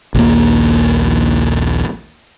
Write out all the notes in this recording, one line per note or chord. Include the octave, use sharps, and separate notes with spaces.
A#1 D#2 A#3